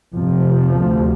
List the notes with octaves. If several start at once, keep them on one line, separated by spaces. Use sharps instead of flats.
F2 C3 F3
D2 C3